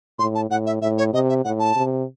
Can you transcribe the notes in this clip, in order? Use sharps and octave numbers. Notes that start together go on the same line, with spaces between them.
A2 C6
A5
A2 F#5
E5
A2 E5
C#5
C3 D#5
E5
A2 F#5
A5
C3